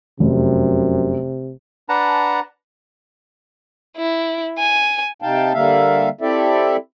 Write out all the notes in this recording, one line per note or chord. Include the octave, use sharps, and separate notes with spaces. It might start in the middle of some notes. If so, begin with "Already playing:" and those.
F1 F#2 C3
D4 B4 F#5 A5 A#5
E4
G#5
C3 D#4 F5 G5 A5
D3 G3 A#3 E5 F5
C4 E4 G4 A4 D5 E5